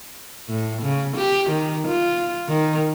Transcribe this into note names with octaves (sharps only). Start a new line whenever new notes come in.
A2
C#3
G4
D#3
F4
D#3